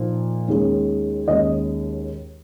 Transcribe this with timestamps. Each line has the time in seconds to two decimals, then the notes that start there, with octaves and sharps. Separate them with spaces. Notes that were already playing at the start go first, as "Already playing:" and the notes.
Already playing: A#2 F3 A#3 D#4
0.48 D#2 D#3 G#3 C#4
1.28 D#2 D#3 G#3 C#4 D#5